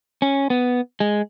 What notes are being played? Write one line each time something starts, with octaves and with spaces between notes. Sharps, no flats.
C#4
B3
G#3